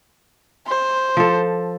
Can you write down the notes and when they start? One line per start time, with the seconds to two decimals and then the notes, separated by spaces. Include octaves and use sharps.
0.68 C5
1.17 F3 A4